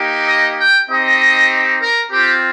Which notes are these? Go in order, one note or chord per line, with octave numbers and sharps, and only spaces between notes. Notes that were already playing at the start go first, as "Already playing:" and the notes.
Already playing: A#3 D#4 G4
D#5
G5
C4 D#4 G4 D#5
A#4
C4 F4 G4